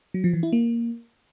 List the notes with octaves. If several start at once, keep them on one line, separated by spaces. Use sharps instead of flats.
F#3
F3
E3
E4
A#3